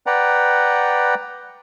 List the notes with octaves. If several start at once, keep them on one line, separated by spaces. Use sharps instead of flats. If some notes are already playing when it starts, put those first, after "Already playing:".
B4 D5 F#5 G5 A#5